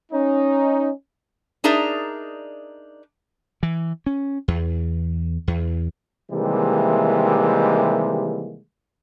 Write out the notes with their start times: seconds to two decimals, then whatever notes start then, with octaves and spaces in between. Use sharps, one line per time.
0.12 C#4 D#4
1.64 D4 D#4 G#4 A#4 D5 E5
3.63 E3
4.06 C#4
4.48 E2
5.47 E2
6.31 C3 D#3 E3 G3 G#3 A#3